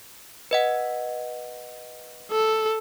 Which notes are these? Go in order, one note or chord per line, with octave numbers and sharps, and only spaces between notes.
B4 D#5 F#5
A4